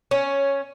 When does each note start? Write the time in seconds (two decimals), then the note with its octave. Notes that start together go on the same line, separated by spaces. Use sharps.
0.11 C#4